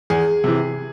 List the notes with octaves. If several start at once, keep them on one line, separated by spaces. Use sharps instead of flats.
E2 G#4
C3 E3